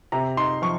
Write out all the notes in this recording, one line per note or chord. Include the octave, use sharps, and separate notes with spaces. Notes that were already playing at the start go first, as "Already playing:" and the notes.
C3 A#5
D#4 C6
F3 C#6